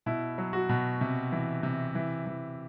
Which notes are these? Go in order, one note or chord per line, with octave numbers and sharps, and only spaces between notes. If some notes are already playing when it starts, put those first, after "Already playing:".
B2 E4
F#3
F#4
B2
C3
E3
C3
E3
E3